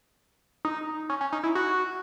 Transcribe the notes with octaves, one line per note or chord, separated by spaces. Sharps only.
D#4
C#4
C#4
D#4
E4
F#4